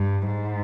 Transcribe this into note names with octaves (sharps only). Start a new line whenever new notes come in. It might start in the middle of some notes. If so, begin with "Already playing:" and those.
Already playing: G2
G#2